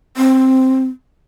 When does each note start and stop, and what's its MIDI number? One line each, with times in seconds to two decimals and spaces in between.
0.17 0.85 60